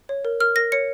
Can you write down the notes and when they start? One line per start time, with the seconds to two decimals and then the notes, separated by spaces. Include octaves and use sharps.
0.09 C#5
0.25 A#4
0.40 A#4 F6
0.56 A#4 A#6
0.72 C#5 C#7